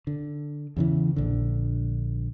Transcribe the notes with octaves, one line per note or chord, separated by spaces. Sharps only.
D3
E2 C#3 E3
A#1 D3